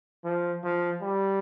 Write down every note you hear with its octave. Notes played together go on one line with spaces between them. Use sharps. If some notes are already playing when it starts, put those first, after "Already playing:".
F3
F3
G3